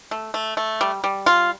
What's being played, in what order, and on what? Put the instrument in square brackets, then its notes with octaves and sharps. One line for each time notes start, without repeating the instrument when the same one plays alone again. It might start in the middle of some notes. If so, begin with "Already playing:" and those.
[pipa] A3
A3
A3
G3
G3
F4